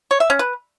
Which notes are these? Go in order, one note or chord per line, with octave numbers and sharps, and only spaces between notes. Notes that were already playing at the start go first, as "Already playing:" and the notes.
C#5
E5
C#4
B4